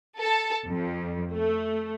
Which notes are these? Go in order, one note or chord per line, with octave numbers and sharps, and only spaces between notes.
A4
F2
A3